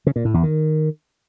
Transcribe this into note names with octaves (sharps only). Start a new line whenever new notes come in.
C#3
A#2
A2
E2
D#3